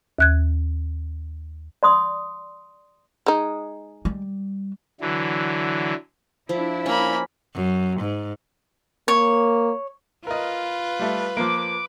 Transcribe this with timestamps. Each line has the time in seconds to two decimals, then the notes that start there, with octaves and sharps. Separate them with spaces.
0.19 D#2 F#6 G#6
1.83 D5 C6 D#6
3.26 G#3 D#4
4.05 G3
5.01 D3 E3 F#3
6.49 F3 D4 E4
6.86 A#3 C#4 B5
7.55 F#2
8.01 G#2
9.08 A#3 C#5
10.27 F4 A#4 B4 D#5
11.00 G3 A3
11.37 F3 A#3 D6